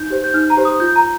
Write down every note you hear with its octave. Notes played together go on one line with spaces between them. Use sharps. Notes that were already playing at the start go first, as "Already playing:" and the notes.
Already playing: D#4 G6
G4 C5
G6
D#4 F6
A#5
G4 C5
D#6
F4 G6
A#5